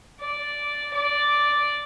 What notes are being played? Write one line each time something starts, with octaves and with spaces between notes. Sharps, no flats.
D5
D5